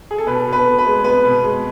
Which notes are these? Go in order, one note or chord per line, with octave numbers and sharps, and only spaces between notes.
G#4
A4
B2 B4
B2
B4
B3
B4
G#3
B3 B4
B2
G#3